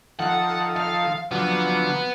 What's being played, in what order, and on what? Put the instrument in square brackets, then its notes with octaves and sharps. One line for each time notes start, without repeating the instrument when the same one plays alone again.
[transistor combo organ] D#3 F3 A4 [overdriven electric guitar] F#5
[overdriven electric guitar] F5
[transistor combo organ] D3 F3 F#3 [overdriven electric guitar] B3